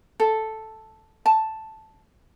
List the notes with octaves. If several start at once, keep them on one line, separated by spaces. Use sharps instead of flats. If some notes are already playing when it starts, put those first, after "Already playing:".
A4
A5